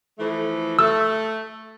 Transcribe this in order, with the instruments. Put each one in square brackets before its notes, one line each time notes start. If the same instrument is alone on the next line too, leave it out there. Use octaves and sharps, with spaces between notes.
[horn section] E3 F3 A3
[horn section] A3 [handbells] E6